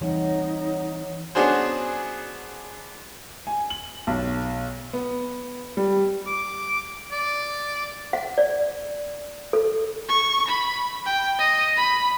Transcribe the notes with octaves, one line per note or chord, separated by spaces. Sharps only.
E3 G3 C4 D#4 C#5 F#5
B3 C#4 D4 F#4 G#4 C5
G#5
F#7
B1
B3
G3
D6
D5
F#5
D5
A4
C#6
B5
G5
D#5
B5